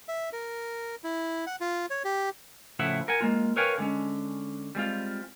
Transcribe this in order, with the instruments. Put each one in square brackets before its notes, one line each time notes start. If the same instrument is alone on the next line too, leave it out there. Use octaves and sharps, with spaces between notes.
[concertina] E5
A#4
E4
F#5
F4
C#5
G4
[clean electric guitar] A2 C#3 F3 E4 E5 F#5
A#4 F#5 G#5
G#3 A#3 F4
A#4 B4 C#5 F5 G5 G#5
D3 G#3 C#4
G3 G#3 C4 F4